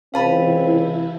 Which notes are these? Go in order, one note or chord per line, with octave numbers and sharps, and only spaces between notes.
C#2 C3 E3 C4 E4 F5 A5 B5